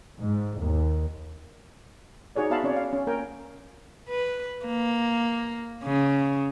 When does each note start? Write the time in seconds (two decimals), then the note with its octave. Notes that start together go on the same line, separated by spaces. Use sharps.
0.20 G#2
0.60 D#2
2.36 D#4 F#4 G#4 C#5 D5
2.50 B3 F#4 E5 F5 A5 B5
2.64 C4 C#4 C#5 D5
2.76 F5
2.93 C#4
3.07 A#3 A#4 G5 G#5
4.09 B4
4.65 A#3
5.83 C#3